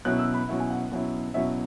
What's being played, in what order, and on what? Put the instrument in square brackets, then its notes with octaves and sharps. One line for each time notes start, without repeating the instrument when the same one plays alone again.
[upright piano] B2 F#3 C#4 E4 F#6
E6
B5
B2 F#3 C#4 E4
G#5
F#5
B2 F#3 C#4 E4
B2 F#3 C#4 E4 E5